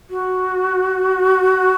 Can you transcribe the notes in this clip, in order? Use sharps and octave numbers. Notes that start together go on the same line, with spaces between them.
F#4